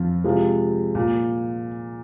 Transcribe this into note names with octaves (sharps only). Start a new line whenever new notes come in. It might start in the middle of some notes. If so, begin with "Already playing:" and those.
Already playing: F2 F3 C4 F4
C3 F3 G#3 F4
A#2